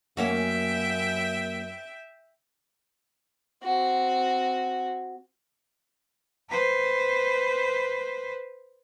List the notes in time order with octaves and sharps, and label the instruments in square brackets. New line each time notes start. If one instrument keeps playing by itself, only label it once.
[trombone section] F#2 [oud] A#3 C#4 F#4 [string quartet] E5 G5
[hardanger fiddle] C4 F#4
[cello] B4 C5